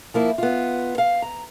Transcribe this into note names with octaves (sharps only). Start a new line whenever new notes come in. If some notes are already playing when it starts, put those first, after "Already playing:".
F3 A#3 E4
B3 F4
F5
A#5